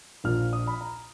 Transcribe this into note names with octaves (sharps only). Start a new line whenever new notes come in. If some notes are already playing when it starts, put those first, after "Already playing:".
A#1 A#2 F3 F6
D#6
B5
A#5